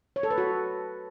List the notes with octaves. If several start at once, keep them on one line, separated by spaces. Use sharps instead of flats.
C#5
A4
B4
F#4